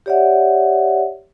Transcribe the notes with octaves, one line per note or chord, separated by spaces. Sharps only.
G4 C#5 D5 E5 F#5